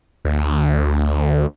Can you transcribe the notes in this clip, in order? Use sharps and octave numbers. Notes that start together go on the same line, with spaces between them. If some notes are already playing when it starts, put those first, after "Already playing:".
D2